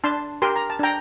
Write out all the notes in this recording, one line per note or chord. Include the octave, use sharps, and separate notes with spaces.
D4 A5 C6
G4 A#4 C6
A#5
A5
D4 G5 A#5